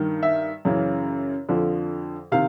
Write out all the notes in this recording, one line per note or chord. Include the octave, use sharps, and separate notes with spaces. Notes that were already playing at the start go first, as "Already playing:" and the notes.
Already playing: G2 D#3
E5
F#2 C#3 E3
F2 D3 F3
C3 D#3 F5